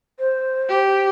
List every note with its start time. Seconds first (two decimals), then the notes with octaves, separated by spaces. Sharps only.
0.19 C5
0.69 G4